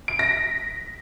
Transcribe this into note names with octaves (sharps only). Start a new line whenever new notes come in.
D7
A#6
B6